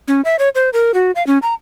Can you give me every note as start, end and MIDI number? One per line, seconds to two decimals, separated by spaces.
0.08 0.21 61
0.25 0.36 76
0.39 0.49 73
0.55 0.70 72
0.73 0.92 70
0.94 1.11 66
1.15 1.25 77
1.27 1.38 61
1.42 1.54 82